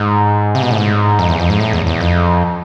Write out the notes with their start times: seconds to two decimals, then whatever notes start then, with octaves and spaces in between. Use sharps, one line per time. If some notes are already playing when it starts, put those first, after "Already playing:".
Already playing: G#2
0.55 C3
0.62 B2
0.71 A2
0.78 G#2
1.19 F2
1.29 E2
1.39 F2
1.50 G#2
1.60 A2
1.73 E2
1.86 E2
2.01 F2